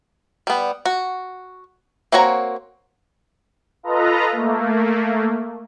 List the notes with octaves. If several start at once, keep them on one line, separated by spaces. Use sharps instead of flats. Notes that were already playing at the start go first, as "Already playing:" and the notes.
G3 B3
F#4
A#3 C4 F#4 C#5 A#5
F4 A4 B4 D#5 A#5
A3 A#3